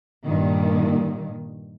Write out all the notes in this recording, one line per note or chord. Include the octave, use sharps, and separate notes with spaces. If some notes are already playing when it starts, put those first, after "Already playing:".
G2 A#2 D#3